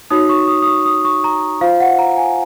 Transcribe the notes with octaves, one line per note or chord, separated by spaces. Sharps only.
D#4 F#4 C#5 D#6
C#6
D#6
D#6
C#6
D#6
C#6
A#5
F4 C5 F5
F#5
A#5
G#5